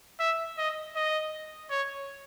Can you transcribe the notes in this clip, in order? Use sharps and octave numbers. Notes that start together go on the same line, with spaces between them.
E5
D#5
D#5
C#5